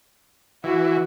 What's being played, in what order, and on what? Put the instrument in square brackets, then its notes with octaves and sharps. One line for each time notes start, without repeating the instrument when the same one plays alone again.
[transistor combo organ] E3 [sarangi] F#4